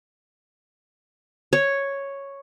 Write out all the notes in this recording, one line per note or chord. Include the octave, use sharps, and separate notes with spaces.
C#5